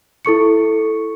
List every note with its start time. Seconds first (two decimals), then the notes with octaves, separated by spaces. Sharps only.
0.25 E4 A4 C#6 C#7